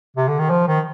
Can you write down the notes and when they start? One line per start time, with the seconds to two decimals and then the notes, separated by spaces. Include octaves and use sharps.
0.17 C3
0.28 D3
0.39 D#3
0.50 F3
0.68 D#3